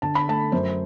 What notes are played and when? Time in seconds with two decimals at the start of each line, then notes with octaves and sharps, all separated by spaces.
0.02 D3 A5
0.15 B5
0.28 A3 A5
0.52 F#2 C5